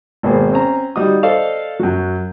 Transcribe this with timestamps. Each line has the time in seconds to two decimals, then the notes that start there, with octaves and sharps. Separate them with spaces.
0.23 G#1 B2 A#3 G#4 C5
0.52 C4 C#4 A#5
0.96 G3 D#4 F#4 D#6
1.23 A4 C5 D5 D#5 F5
1.79 F#2 F#3